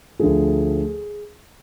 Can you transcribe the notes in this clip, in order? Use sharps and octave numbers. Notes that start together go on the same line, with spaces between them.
D2 D3 F3 G#4